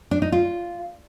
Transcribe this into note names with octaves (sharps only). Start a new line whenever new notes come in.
D4
D#4
F4